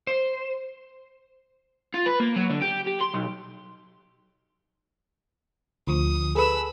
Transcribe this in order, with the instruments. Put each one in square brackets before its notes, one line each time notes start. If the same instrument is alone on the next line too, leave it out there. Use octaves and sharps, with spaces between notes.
[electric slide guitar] C5
[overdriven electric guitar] F4
B4
A#3
F#3
D3
G4
G4
C6
B1
[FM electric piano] D2 F3 [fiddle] D#6
[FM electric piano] G#4 A4 B4 [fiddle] B5 E6